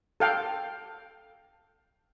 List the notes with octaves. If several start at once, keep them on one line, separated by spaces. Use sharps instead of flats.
A4 F5 G5